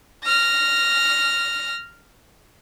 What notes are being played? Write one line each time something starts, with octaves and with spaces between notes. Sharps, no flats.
F6 A#6